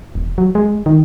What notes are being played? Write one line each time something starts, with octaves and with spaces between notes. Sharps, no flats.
E1
F#3
G#3
D#3